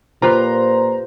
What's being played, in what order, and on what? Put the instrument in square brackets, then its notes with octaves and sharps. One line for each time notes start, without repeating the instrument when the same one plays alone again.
[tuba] A#2 [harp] F4 G4 B4 [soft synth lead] C5 [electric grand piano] A#5 C6